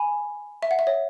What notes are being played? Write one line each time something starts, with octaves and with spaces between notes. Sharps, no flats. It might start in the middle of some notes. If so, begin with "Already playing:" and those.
Already playing: G#5 B5
E5
F#5
E5
C#5